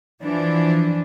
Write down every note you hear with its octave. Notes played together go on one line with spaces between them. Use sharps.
E3 F3 D4